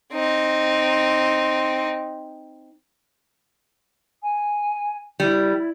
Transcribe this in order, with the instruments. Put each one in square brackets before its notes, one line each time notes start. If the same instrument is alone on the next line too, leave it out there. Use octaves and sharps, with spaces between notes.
[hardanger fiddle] C4 D#4
[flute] G#5
[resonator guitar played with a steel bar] G3 [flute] E4